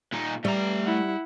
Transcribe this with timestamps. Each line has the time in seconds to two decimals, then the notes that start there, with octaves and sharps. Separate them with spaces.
0.13 A#2 D#4
0.45 G3 A3 A#5
0.86 E4 F#5